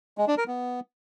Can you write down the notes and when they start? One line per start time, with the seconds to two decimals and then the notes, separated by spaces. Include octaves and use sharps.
0.18 G#3
0.28 D4
0.38 A#4
0.48 B3